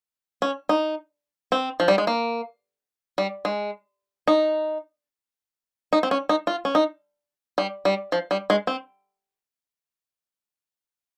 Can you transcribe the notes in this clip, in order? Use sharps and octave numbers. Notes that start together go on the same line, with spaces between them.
C#4
D#4
C4
F3
G3
G#3
A#3
G3
G#3
D#4
D#4
C4
C#4
D#4
F4
C#4
D#4
G3
G3
F3
G3
G#3
C4